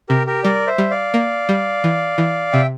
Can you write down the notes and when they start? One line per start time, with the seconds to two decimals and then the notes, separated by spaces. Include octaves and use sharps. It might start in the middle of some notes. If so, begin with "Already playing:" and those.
0.09 C3 G4 A#4
0.27 G4 A#4
0.44 G3 A#4 D5
0.67 C5 E5
0.78 G3
0.90 D5 F5
1.14 A#3
1.49 G3
1.84 E3
2.18 E3
2.53 C3 E5 G5